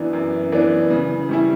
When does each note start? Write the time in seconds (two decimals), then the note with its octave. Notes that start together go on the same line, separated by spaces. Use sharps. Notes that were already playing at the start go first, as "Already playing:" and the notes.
Already playing: F#2 E3 B3 D4
0.13 F#2
0.52 E3 B3 D4
0.90 C#3
1.29 G3 C#4 E4